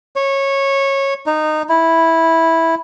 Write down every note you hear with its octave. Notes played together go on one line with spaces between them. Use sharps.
C#5
D#4
E4